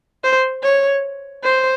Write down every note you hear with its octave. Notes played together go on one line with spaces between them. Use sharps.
C5
C#5
C5